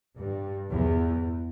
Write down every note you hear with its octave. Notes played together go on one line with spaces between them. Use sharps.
G2
E2